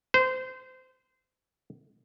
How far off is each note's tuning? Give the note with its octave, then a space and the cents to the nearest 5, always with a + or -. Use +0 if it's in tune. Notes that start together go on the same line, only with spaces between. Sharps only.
C5 -25